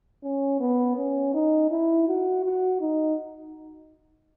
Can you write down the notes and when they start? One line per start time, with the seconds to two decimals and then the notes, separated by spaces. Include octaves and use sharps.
0.23 C#4
0.60 B3
0.97 C#4
1.34 D#4
1.71 E4
2.08 F#4
2.44 F#4
2.81 D#4